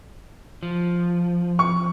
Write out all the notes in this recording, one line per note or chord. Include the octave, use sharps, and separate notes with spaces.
F3
C#6